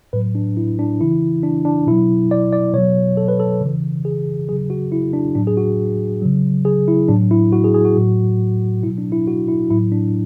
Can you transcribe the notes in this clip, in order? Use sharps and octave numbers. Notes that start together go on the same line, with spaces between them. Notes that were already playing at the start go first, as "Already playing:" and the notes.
A2 F#3 B4
D4
E4
D4
C#3 E3 E4
D4
D4
B2 F#3 E4
D5
D5
B2 F#3 C#5
A4
B4
A4
C#3 E3
G#4
C#3 F#3 G#4
F#4
E4
D4
A2 F#3 D4
G#4
F#4
C#3 F#3
G#4
E4
A2 F#3 D4
E4
F#4
G#4
G#4
F#4
A2 F#3
B2 F#3 E4
D4
E4
F#4
E4
A2 F#3 E4
D4